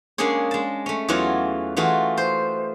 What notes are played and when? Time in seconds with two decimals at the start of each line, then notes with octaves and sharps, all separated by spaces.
0.18 G#3 A#3 C#4 D4 G#4 C#5
0.51 G#3 A5
0.86 A3 C#4
1.08 E2 E3 F#3 F4 F#4 C#5
1.77 E3 A3 F4 F#4 G#4
2.17 C5